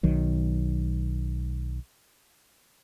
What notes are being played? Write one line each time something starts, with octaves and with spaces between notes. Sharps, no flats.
B1 D#3 F#3